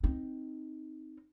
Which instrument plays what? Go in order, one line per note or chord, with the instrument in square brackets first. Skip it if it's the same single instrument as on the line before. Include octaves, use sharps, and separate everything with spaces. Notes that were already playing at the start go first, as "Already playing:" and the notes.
[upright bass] C4 D#4